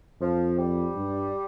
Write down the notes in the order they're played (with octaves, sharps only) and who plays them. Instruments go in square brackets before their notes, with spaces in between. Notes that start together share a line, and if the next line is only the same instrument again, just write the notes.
[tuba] F2 [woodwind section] F3
[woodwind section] G3
[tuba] G2